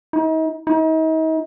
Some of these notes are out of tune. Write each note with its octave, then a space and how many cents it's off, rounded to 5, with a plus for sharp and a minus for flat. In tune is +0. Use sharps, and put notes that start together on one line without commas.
D#4 +40
D#4 +40